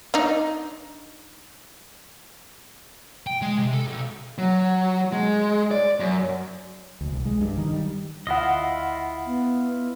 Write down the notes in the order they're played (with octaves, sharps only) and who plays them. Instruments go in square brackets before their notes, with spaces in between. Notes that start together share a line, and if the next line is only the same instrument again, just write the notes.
[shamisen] D4 D#4
[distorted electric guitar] G5
G#3
C3
A4
B1
[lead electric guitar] F#3
G#3
D5
F#2
[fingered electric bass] D2
C2
G#3
G2
D#3
G3
[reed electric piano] D2 F#5 [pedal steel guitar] E4 F4 D#5
[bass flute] B3